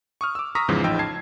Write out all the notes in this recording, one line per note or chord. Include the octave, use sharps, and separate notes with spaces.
C#6 D#6 F6
D6 E6
A#5 C#6 D#6 E6 A#6 B6
E2 G#2 C#3 E3 F3
A1 F3 D#4 G5 E6
A5 G#6 C7